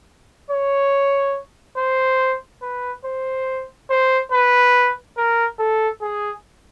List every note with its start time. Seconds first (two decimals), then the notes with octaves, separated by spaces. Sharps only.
0.51 C#5
1.77 C5
2.62 B4
3.05 C5
3.90 C5
4.32 B4
5.17 A#4
5.59 A4
6.02 G#4